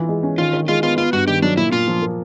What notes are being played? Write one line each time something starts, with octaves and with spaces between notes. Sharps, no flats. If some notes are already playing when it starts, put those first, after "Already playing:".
Already playing: E3 F4
G#3
C#4
D#3 F4
D#3
G#3 F4
B3 F4
B3 F4
G2 F#4
D#3 G4
F#3 D4
A#2 E4
A#2 F4
F3
A#3